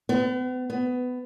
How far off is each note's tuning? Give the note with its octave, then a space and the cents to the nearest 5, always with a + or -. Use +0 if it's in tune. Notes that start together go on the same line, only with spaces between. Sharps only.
B3 +40
B3 +20